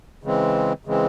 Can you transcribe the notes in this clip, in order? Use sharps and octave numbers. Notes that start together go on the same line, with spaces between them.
C#3 E3 G#3 C4
C#3 E3 G#3 C4